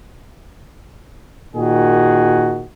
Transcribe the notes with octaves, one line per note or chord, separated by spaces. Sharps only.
A#2 D#3 F#4 G#4